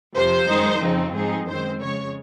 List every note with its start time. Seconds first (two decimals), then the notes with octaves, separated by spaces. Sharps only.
0.16 F2 C3 F3 C5
0.49 F#2 D#3 G#3 D#4
0.82 F2 C#3 F3 C4 D#4
1.15 G#2 F3 C4 D#4 G#4
1.48 F#2 D#3 G#3 C4 C5
1.81 F2 C#3 G#3 C#5